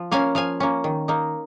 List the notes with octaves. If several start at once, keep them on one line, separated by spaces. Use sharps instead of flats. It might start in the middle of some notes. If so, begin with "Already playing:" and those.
Already playing: F3
A#3 C#4 F5 G#5
F3 F5 G#5
A#3 C#4
D#3
A#3 D#4